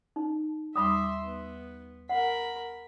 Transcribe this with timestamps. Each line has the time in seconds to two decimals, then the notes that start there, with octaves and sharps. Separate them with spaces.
0.16 D#4
0.76 D#2 G3 E5 B5 C6 D6 D#6
1.23 B3
2.09 A#4 F#5 B5